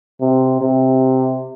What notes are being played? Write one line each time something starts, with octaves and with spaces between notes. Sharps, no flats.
C3
C3